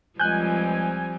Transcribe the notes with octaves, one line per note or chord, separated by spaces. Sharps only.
C#2 F3 G3 C4 G#5 F#6 G6